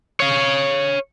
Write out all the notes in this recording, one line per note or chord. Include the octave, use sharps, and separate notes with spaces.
C#5 F5